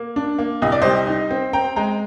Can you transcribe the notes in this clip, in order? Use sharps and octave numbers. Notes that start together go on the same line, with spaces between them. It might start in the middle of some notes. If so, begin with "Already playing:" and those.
Already playing: A#3
D4
A#3
C2 D#5
D5
G3 C5 D#5
D#4
C4
C4 G5 A#5
G#3 G5 A#5